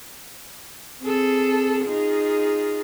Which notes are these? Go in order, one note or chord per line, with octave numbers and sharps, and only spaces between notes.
C4 G#4 A4
D#4 F4 G#4